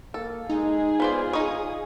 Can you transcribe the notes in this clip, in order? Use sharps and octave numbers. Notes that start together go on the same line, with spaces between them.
A#3 A4
G#3 D#4 G#4
B3 F4 C5 D5
D#4 C#5 D#6